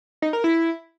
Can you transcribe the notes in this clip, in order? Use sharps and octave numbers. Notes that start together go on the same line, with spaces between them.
D#4
A#4
E4